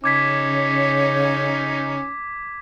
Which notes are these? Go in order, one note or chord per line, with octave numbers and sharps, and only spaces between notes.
C#3 C#4 D#4 D6 G#6 B6